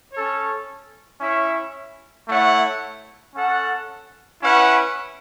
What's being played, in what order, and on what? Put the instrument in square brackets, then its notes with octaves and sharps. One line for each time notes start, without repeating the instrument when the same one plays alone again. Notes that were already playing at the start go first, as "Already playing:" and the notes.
[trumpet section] C#4 A4 C#5
C#4 E4 C#5 E5
A3 E4 C#5 F#5
C#4 A4 F#5
C#4 E4 B4 F#5